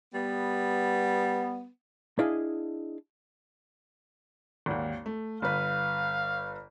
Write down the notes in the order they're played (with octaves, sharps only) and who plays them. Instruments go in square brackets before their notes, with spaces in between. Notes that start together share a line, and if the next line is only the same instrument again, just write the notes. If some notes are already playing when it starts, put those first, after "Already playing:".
[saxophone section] G3 B3
[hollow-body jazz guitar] D4 E4 G#4 D#5 F5
[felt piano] G#1 D#2
A3
[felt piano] G1 B4 [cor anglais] F5